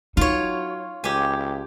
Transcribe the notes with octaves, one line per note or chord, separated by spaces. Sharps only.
F#3 D#4 F4 C#5
C#2 G4 G#5